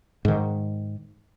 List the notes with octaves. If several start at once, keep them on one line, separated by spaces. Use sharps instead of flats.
G#2 D#3